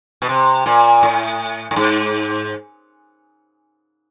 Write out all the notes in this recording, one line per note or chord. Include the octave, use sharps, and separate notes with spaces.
B2
C3
A#2
A2
A2
G#2